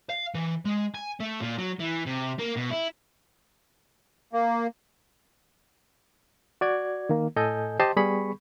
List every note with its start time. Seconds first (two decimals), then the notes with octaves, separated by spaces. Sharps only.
0.10 F5
0.35 E3
0.65 G#3
0.95 G#5
1.20 A3
1.41 A#2
1.58 F#3
1.80 E3
2.06 C3
2.39 A#3
2.57 B2
2.71 E4
4.33 A#3
6.61 F#4 D5 G#6
7.09 D#3 A#3
7.36 A2 A4 D#5 G#5 G6
7.80 G4 C5 D#5 A5 C6
7.96 G3 B3 G#4 B5 C#6